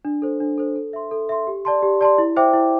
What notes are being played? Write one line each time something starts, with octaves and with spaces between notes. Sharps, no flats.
D4
A4 C5
D4
A4 C5
A4
E5 C6
A4
E5 C6
G4
D5 A5 C6
G4
D5 A5 C6
E4
C5 E5 G5 D6
E4